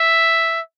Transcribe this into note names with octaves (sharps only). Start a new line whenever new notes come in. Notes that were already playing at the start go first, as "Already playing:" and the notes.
Already playing: E5